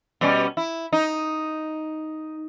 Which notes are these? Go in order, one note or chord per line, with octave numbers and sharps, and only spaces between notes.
B2 G3 C#4
E4
D#4